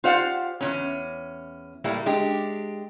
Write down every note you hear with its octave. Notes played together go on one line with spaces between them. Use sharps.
F4 G4 C5 D5 F5 F#5
E2 A#2 C#4
A2 G3 A#3 E4
G#3 D4 G4